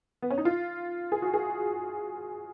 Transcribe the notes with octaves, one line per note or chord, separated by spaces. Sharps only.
B3
C#4
D#4
F4
G#4
F#4
G#4